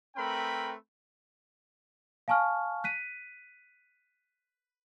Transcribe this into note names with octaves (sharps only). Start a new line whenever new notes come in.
A3 C4 A#4 B4 G5 B5
F5 G#5 A5 C#6 F6
F#6 B6 D#7